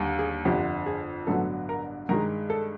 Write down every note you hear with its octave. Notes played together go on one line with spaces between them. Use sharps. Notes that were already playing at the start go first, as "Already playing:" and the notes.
Already playing: D#2 D3 G3
G#4
G1 F2 D3 G4
G#4
A1 G2 D3 F#3 B3 A4
A#4
G2 D#3 G#3 A#4
A4